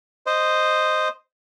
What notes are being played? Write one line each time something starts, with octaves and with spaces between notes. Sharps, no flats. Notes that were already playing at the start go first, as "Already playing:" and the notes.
C5 D#5